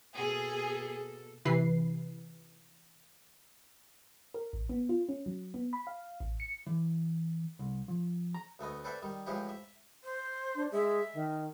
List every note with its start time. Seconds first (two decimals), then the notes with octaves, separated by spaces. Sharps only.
0.15 B2 A#3 G#4 A4
1.45 C3 E3 B4 C7
4.34 A#4
4.53 A1
4.69 B3
4.89 F4
5.09 C#4
5.26 F#3
5.54 B3
5.73 B5
5.87 F5
6.20 A1
6.40 C#7
6.66 E3
7.59 C2
7.88 F3
8.34 A#5
8.59 D2 A3 B3 D#5
8.84 C4 A4 B4 C5 D5 E5
9.02 D#3 G3
9.27 A2 E3 F3 G#3 E4 G4
9.49 E5
10.04 C5
10.55 D4
10.72 G#3 E5
11.14 D#3